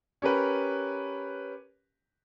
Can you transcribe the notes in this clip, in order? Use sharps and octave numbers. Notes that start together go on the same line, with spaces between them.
C#4 G4 A#4 B4